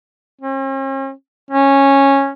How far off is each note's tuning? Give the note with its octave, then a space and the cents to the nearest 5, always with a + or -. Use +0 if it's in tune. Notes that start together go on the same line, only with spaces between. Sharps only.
C#4 -45
C#4 -10